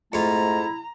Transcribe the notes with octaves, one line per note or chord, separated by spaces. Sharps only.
F2 G#2 A3 E4 F4 A#5